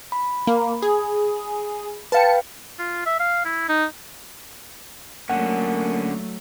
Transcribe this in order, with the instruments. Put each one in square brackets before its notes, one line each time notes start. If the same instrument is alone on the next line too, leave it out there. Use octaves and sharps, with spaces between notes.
[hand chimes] B5
[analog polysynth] A#3
G#4
[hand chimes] B4 F5 G5 [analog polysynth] A5 C#7
[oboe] F4
E5
F5
E4
D#4
[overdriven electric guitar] D3 C#4 [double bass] F#3 A3 [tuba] A#3 [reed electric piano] F#5